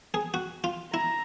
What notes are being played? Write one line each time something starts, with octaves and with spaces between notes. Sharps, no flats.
G#4
F#4
F4
E4 A#5